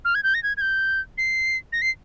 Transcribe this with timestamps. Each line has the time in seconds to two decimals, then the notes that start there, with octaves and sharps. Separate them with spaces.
0.05 F6
0.15 G#6
0.23 G6
0.34 A#6
0.43 G#6
0.57 G#6
0.61 G6
1.18 C7
1.73 A#6
1.82 C7